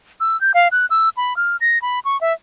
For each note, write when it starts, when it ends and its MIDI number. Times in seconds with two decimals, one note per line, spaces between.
0.20 0.39 88
0.41 0.52 91
0.54 0.68 77
0.71 0.86 90
0.90 1.09 88
1.17 1.36 83
1.36 1.57 89
1.61 1.78 94
1.82 1.99 83
2.05 2.20 85
2.21 2.33 76